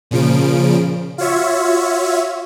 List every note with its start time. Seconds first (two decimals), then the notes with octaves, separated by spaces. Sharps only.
0.11 A#2 C#3 F3 D7
1.18 F4 F#4 C#5 E5